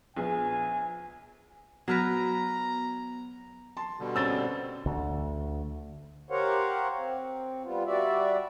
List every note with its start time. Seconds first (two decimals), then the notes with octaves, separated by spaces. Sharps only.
0.17 A#1 B3 G#4 G#5
1.88 F#3 B3 A#4 B4 A#5
3.77 A5 C6
4.00 B2 D3 G3
4.16 C4 C#4 G#4 E6 A6 G7
4.86 D2 D3
6.30 G4 A#4 C5 C#5 F5 F#5
6.97 C4
7.64 G3 B3 F4
7.86 G3 F#4 D5 E5